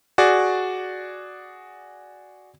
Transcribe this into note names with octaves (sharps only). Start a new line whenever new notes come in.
F#4 G#4 D5